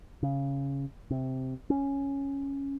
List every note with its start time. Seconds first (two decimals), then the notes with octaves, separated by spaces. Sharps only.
0.23 C#3
1.11 C3
1.70 C#4